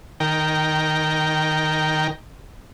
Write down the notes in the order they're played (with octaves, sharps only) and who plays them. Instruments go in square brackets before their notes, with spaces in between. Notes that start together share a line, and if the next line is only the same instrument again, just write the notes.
[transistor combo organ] D#3 A#4 G5